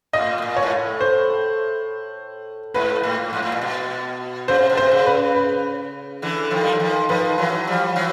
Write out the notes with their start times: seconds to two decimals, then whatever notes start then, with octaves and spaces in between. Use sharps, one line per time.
0.13 A2 D#5
0.38 B2
0.42 A#2
0.57 C#5
0.63 G#2
0.71 A2
1.01 C5
2.74 G#2 B4
3.03 A2
3.33 G#2
3.42 A2
3.52 A#2
3.61 B2
4.48 C#3 C5
4.58 C3
4.70 B2
4.77 C3 C5
4.91 C#3
5.06 B4
5.35 B4
6.22 D3 E3
6.51 D#3 F3
6.63 G3
6.72 F#3
6.80 D#3 F3
7.09 D#3 F3 B4
7.38 E3 F#3
7.67 F3 G3
7.96 E3 F#3